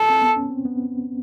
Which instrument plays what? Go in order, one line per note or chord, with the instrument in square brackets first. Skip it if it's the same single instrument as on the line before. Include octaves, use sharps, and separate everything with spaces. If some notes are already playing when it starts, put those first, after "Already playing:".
Already playing: [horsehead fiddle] A4
[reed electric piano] C4
B3
C#4
C4
B3